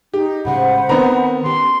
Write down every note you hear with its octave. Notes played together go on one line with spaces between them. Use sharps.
D#4 G4
A2 C#3 G#3 C5 F#5 B5
D#3 B3 C4 A#4 A#5
C#4 G4 C6